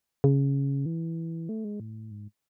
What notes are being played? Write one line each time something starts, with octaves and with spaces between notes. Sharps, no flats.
C#3
E3
A3
G#3
A2
G#2